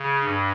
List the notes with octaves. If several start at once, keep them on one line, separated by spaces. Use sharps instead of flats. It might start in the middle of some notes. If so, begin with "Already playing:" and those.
Already playing: C#3
G2